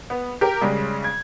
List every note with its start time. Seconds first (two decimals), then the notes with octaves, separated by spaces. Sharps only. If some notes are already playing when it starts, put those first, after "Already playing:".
0.10 B3
0.41 G4 A#4
0.61 C#3 G3 G#3
1.04 G#6